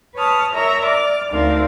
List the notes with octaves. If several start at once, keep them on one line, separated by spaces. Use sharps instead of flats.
B4 C#5 A5 D#6 F6
A#4 C#5 E5 A#5
D5 D6 F6
D2 C4 D#4 A#4 D5 F5